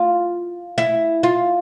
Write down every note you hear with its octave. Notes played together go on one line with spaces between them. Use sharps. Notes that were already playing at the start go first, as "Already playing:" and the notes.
Already playing: F4
E4
F4